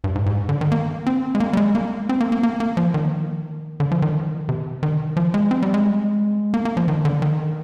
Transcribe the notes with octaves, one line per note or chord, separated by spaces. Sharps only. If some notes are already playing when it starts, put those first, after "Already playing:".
G2
G#2
G#2
D3
D#3
A#3
C4
G#3
A#3
G3
G#3
A#3
C4
A#3
A#3
A#3
A#3
F3
D#3
D3
F3
D#3
C3
D#3
F3
G#3
C4
G3
G#3
A#3
A#3
F3
D#3
D3
D#3